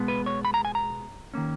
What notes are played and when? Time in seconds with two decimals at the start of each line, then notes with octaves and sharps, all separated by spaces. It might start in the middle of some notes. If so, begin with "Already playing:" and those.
Already playing: B2 G#3 B3
0.08 B4
0.26 C#5
0.45 B5
0.54 A#5
0.65 G#5
0.75 A#5
1.34 D#3 A#3 C#4